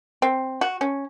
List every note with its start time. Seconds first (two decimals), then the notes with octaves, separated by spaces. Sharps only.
0.22 C4
0.61 F#4
0.81 C#4